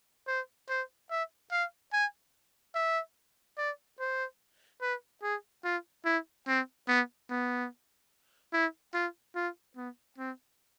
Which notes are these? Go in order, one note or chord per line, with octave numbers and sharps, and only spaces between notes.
C5
C5
E5
F5
G#5
E5
D5
C5
B4
G#4
F4
E4
C4
B3
B3
E4
F4
F4
B3
C4